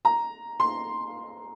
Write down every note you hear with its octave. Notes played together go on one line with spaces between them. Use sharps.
A#5
C6